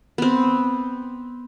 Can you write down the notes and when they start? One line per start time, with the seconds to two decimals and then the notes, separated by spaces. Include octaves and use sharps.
0.18 B3 C4